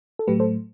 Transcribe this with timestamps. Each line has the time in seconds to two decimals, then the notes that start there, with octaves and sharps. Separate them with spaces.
0.19 A4
0.27 A2 F#3 A3 G4 B4
0.40 A4 C5